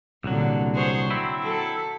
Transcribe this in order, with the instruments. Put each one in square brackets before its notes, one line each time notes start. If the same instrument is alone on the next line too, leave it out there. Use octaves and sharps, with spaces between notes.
[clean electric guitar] C2 F#3 [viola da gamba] A#2 D3
[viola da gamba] G#4 C5 C#5
[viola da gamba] F#3 [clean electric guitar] C4 E4
[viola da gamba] F#3 A4